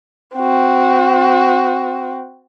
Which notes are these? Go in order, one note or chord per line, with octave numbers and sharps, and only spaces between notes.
C4 F#4